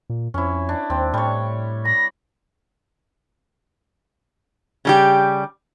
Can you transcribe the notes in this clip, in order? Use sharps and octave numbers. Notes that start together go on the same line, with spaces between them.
A#2
F2 C#4 E4
D4
D#2 C4
A2 G3 C#5
B5 A#6
C#3 G3 G4